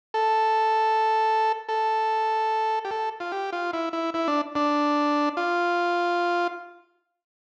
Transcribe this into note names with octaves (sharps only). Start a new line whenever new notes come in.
A4
A4
G4
A4
F4
G4
F4
E4
E4
E4
D4
D4
F4